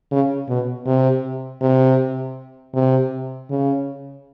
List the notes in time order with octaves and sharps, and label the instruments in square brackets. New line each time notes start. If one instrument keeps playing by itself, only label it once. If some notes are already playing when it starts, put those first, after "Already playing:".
[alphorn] C#3
B2
C3
C3
C3
C#3